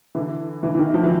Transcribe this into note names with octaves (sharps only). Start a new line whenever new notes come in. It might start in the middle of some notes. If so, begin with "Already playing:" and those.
D3 E3
D3 E3
E3
D#3
F3
E3